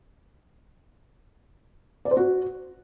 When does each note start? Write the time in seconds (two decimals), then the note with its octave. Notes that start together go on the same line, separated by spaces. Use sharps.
2.05 D5
2.11 C5
2.17 F#4